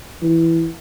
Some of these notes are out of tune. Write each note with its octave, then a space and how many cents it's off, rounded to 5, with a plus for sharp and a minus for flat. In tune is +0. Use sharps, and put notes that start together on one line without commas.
E3 +0